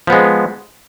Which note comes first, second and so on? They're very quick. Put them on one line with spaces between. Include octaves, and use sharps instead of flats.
F3 B3 G#3